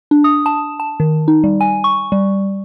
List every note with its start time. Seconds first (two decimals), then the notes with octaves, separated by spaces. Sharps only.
0.11 D4
0.24 D#6
0.46 A5
0.80 A5
1.00 D#3
1.28 D#4
1.44 G3
1.61 G#5
1.84 C#6
2.12 G3